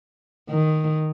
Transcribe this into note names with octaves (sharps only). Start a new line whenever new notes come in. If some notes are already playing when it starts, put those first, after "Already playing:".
D#3